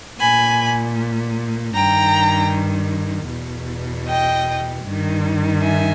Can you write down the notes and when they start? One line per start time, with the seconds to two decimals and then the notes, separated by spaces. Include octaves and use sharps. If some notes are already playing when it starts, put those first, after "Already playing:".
0.20 A#2 G#5 B5
1.74 G2 D#3 G5 A#5
3.29 E2 B2
4.07 D#5 G5
4.84 G2 D#3
5.62 E5 G#5